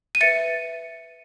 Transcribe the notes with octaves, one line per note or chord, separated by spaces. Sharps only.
D#7
B4 E5 A6 C#7